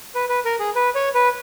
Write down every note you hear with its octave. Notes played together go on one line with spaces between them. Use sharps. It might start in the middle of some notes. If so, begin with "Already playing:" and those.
B4
B4
A#4
G#4
B4
C#5
B4